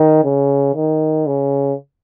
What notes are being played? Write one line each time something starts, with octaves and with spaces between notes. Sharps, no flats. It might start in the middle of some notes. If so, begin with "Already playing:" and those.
Already playing: D#3
C#3
D#3
C#3